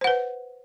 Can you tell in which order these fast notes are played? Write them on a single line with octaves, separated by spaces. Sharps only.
C5 F#5 B4